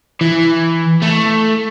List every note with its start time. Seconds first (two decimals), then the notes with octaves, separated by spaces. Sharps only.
0.21 E3
1.03 A3